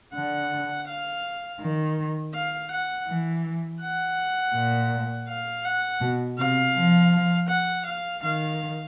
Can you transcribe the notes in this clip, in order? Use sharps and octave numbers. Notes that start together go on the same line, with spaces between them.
D3 F#5
F5
D#3
F5
F#5
E3
F#5
A#2
F5
F#5
B2
C3 F5
F3
F#5
F5
D#3 F5